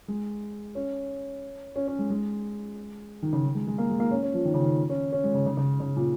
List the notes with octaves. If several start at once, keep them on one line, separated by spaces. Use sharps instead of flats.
G#3
C#4
C#4
C#4
G#3
G#3
D#3
C#3
D#3
G#3
G#3
A#3
G#3
A#3
C#4
C#4
F3
D#3
C#3
D#3
C#4
C#4
G#3
C#3
C#3
C#3
C#3
A#2